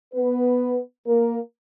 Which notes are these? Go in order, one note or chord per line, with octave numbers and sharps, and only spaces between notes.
B3 B4
A#3 A#4